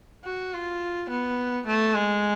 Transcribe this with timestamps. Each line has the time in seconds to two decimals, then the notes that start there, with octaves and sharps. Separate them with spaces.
0.25 F#4
0.53 F4
1.10 B3
1.67 A3
1.95 G#3